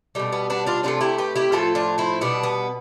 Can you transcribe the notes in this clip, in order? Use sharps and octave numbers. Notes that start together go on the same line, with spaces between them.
B2 G3 A3
B3
B3 D4
D4 F4
C3 E3 A3 D4 F4
E4 G4
G4 B4
E4 G4
A2 F3 A3 F4 A4
D4 F4
C4 E4
B2 G3 B3 D4
B3